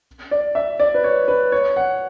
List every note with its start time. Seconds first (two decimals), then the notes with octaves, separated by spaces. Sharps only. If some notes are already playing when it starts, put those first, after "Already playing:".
0.31 D5
0.55 E5
0.80 D5
0.94 B4
1.04 C#5
1.28 B4
1.52 C#5
1.76 F#5